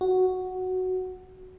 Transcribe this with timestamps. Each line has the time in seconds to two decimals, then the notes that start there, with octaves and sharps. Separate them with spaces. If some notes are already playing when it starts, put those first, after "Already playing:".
0.01 F#4